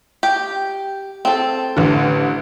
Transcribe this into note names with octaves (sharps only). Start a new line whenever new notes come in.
G4
C4 A4
A1 D3